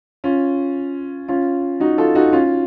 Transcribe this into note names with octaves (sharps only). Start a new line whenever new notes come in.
C#4 F4
C#4 F4
D#4 F#4
F4 A4
D#4 F#4
C#4 F4